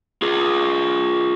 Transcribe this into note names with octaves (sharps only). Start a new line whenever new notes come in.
F4 G#4